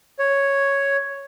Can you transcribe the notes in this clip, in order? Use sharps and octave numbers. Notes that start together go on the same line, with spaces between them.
C#5